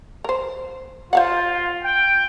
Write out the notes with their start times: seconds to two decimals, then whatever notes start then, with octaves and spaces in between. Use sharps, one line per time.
0.24 A#4 C5
1.13 F4 C5 F5 F#5
1.83 G5